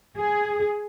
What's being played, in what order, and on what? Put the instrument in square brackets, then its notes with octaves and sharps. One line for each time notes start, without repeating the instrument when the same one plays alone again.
[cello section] G#4